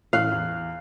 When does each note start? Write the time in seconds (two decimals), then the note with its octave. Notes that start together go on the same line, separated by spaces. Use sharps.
0.13 A1 A2 F5 F#6
0.32 E2